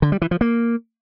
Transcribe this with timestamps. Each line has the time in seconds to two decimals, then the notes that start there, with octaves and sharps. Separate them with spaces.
0.02 D3
0.12 G3
0.22 E3
0.31 F3
0.41 A#3